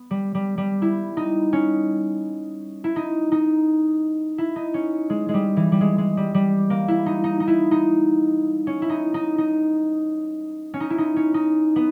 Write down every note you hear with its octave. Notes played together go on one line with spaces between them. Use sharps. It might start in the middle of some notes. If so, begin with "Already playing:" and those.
Already playing: B3
G3
G3
G3
E4
D#4
C#4
E4
D#4
D#4
E4
D#4
C#4
G#3
G#3
G3
E3
G3
G#3
G#3
G3
G3
A#3
E4
D#4
D#4
D#4
E4
D#4
C#4
E4
D#4
D#4
D#4
C#4
D#4
E4
D#4
C#4
D#4
B3